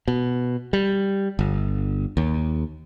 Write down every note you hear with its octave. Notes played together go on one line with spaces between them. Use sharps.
B2
G3
G1
D#2